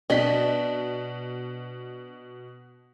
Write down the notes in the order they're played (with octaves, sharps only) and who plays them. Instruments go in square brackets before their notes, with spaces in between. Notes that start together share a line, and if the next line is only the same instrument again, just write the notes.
[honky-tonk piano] B2 B6 [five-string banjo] D4 D#5